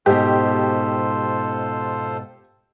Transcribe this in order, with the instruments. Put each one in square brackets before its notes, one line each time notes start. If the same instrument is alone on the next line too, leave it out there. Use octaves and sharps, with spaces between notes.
[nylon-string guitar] G#2 B2 [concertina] F4 A4 C5 [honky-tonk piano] G4